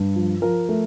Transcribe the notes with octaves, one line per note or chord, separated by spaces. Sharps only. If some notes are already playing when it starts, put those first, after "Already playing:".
Already playing: G2
F3
F3 A#4
A3